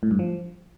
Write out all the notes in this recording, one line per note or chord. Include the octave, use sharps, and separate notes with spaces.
A2
G2
F3